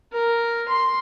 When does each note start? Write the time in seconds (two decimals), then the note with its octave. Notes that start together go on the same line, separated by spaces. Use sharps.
0.13 A#4
0.68 C6